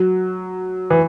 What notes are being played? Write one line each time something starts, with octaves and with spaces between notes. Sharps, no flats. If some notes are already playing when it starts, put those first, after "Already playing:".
Already playing: F#3
E3